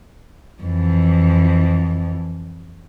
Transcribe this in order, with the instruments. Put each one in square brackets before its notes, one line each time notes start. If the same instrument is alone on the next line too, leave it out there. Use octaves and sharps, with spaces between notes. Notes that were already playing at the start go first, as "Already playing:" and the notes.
[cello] F2 E3